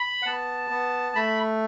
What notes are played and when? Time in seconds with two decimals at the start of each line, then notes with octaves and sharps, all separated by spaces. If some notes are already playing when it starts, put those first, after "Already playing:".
Already playing: B5
0.22 F#5
0.26 B3 A5
0.70 B3
1.15 A3 B5